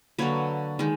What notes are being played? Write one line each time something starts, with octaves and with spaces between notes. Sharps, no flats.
D3 F#3 A#3 B4 C#5
D#3 G#3